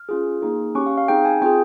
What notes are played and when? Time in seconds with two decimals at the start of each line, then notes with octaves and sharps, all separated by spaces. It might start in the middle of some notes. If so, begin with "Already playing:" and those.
Already playing: F6
0.09 C#4 F4 G#4
0.42 A#3 D#4 G#4
0.75 C#4 G4 C#6
0.86 F5
0.98 F5
1.08 C4 D#4 G#4 G5
1.25 G#5
1.42 C4 F4 G#4 G5